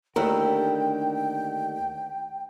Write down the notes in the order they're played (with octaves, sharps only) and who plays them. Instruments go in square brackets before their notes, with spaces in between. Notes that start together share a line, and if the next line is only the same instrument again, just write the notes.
[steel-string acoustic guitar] D#2 D3 [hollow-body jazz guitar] A3 E4 A#4 [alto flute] G5